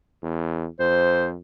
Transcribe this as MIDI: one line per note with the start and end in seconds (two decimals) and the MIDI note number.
0.23 0.67 40
0.80 1.38 41
0.80 1.27 72